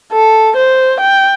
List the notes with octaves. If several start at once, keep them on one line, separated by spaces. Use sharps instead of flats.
A4
C5
G5